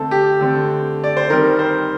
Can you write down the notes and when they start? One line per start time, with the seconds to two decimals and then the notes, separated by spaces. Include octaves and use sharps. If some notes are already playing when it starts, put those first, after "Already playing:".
Already playing: D3 A3 C4 A4
0.11 G4
0.41 D3 A3 C4
1.04 D5
1.17 C5
1.30 D#3 G3 C4 A#4
1.59 C5